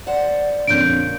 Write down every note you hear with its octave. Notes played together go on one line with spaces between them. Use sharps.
C5 D5 F#5
F2 A#2 D3 C#4 G6 D7